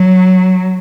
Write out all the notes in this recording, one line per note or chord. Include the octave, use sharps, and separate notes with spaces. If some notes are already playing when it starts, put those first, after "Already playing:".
Already playing: F#3